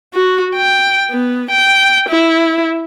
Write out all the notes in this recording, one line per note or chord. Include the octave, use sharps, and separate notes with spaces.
F#4
G5
B3
G5
E4